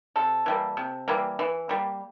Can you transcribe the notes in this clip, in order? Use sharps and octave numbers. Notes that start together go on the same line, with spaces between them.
C3 A4
E3 G3 A#3
C3
E3 G3 A#3
E3
G3 A#3